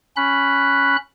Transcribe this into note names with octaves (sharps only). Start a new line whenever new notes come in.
C#4 B5 F#6